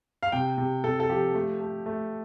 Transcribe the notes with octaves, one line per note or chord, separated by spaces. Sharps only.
F5
C3 G5
C3
C3 A4
A4
F3 G4
A3
A3
A3